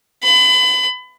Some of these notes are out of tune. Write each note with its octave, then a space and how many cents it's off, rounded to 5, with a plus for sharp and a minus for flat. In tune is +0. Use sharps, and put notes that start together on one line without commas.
B5 +35